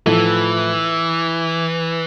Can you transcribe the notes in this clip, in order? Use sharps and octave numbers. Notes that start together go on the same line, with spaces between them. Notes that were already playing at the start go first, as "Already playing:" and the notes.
A2 E3 F3 A3 E4 A4